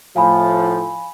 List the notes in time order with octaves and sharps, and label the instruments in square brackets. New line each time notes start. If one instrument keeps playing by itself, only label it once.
[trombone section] A2 F3 [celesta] F5 G#5 B5